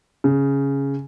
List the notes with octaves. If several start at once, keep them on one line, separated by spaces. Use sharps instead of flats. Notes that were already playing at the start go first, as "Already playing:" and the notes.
C#3